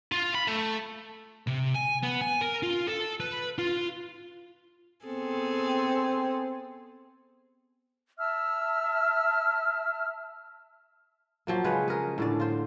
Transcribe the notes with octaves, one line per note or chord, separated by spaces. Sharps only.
F4
B5
A3
C3
G#5
B3
G#5
A#4
F4
A4
B4
F4
B3 C4 G#4 A4
E5 A5 E6 F6
F3 F#3 A#3
C#3 G#3 B4 C#5
G#4 A#4
A2 D3 D5
F4 C5